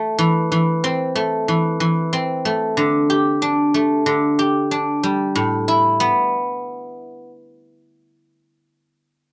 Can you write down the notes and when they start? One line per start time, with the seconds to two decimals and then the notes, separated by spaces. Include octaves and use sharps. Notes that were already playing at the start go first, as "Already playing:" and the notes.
Already playing: A3
0.19 E3
0.52 E3
0.84 C4
1.15 A3
1.48 E3
1.80 E3
2.13 C4
2.45 A3
2.77 D3
3.10 G4
3.42 D4
3.74 A3
4.06 D3
4.39 G4
4.71 D4
5.03 G3
5.35 A2
5.68 E4
6.00 B3